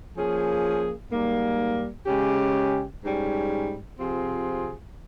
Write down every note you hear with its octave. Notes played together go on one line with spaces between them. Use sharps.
F3 A#3 C#4 G#4
G#2 G3 A#3
C#3 G#3 C#4 G4
G#2 G3 C#4
C3 F3 C4 F4 G#4